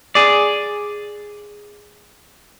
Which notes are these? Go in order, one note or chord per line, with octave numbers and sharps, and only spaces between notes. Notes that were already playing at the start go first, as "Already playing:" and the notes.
G#4 D5